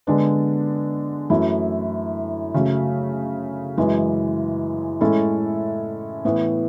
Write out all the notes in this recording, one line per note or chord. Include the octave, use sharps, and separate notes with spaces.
D3 G#3 B3 D4
F#2 E3 A3 E4
C#3 F#3 A3
F#2 E3 G#3
A2 G#3 C#4 E4 A4
A2 E3 B3